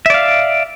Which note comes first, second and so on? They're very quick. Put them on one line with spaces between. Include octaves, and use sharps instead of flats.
E5 D5 F5